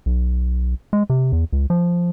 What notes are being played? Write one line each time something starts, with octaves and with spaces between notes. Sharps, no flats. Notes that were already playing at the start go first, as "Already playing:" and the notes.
B1
G#3
C3
E2
C#2
F3